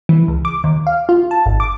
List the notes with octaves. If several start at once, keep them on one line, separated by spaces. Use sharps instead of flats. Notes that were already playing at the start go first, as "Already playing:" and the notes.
E3
C#2
D6
D#2
F5
F4
A5
G#1
D6